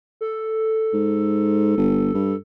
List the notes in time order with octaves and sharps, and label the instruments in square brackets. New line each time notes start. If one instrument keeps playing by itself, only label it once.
[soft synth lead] A4
[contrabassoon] G#2
G1
G2